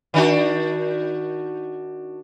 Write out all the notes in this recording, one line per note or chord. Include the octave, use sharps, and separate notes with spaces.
D#3 D4 F#4